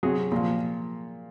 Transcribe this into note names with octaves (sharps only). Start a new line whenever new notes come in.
C3 F#3 G#4
A#2 F3